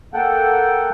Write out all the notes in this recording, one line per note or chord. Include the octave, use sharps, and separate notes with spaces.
A#3 A4 F#5 G5